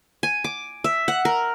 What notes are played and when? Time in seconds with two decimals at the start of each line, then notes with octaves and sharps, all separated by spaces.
0.23 G#5
0.44 D6
0.84 E5
1.08 F#5
1.25 A#4